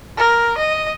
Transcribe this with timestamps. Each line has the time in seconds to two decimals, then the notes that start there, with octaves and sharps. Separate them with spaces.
0.17 A#4
0.58 D#5